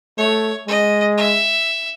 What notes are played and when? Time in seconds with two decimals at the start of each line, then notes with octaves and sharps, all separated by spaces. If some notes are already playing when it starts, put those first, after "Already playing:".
0.18 A3 C#5
0.67 G#3 D#5
1.18 E5